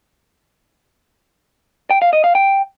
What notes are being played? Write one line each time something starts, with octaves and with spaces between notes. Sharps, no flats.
G5
F5
D#5
F5
G5